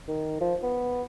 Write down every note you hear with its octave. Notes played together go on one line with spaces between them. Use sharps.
D#3
F3
B3